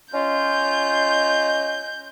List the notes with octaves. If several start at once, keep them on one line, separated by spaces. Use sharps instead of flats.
C#4 F4 D#5 G6